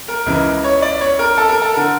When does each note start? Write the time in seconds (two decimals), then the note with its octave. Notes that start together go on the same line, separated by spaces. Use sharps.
0.08 A#4
0.26 C#2 C#3 E3 A#4
0.64 C#5
0.82 D5
1.01 C#5
1.19 A#4
1.37 A4
1.49 A#4
1.62 A4
1.74 D3 A#4